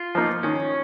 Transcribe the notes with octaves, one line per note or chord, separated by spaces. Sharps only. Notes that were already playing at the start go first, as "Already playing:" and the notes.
Already playing: F4
F3 A#3 D#4
D#3 C#4